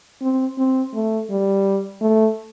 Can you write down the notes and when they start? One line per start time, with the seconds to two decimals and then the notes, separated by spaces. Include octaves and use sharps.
0.21 C4
0.58 C4
0.94 A3
1.30 G3
2.01 A3